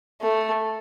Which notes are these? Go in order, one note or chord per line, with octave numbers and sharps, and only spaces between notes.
A3